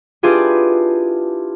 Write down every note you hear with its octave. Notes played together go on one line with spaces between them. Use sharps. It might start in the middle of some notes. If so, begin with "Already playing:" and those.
D4 E4 F4 G4 G#4 B4